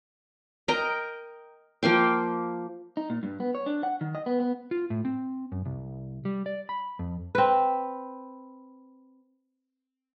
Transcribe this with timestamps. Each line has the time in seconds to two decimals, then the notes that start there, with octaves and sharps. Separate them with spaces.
0.68 A#4 D#5 G5 A#5
1.83 F3 A#3 F5 G5
2.97 D#4
3.10 A#2
3.23 G2
3.40 B3
3.55 C#5
3.66 D4
3.83 F#5
4.01 D#3
4.15 D#5
4.26 B3
4.40 B3
4.71 F4
4.90 A2
5.05 C4
5.52 F#2
5.66 C2
6.25 G3
6.46 D5
6.69 B5
6.99 F2
7.35 C4 B4